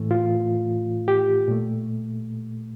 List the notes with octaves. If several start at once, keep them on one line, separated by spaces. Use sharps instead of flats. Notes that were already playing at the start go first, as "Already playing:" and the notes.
Already playing: A2 E3 A3
F4
G4
A#2 A3